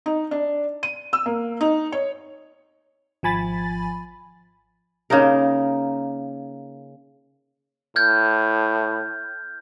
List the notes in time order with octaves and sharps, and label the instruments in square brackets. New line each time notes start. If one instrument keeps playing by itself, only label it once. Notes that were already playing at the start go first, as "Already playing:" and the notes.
[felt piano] D#4
D4
D#7
E6
A#3
D#4
C#5
[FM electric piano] G#1 F3 G#5 B5 A6
[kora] C#3 A#3 D#4 A#4
[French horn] A2 [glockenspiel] F6 G6 G#6